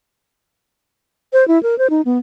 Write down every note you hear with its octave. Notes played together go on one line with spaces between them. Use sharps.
C5
E4
A#4
C5
D#4
B3